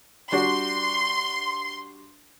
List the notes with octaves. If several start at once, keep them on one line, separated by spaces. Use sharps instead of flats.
G3 D4 F#4 C6